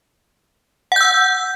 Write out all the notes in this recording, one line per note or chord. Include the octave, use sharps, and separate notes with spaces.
F#5 E6 G6